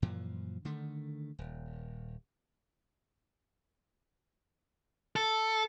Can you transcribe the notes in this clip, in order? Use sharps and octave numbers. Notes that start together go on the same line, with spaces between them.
F#2 A#2 E3 F3
D3 D#3 A3
D#1
A4